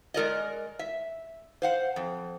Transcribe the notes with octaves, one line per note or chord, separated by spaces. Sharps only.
G#3 A#4 D5 D#5
E5
C5 F5 F#5
F2